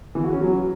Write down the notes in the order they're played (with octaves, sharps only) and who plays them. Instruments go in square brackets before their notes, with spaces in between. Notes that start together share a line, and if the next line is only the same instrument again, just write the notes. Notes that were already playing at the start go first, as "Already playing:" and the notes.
[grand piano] E3
F#4
C#4
F#3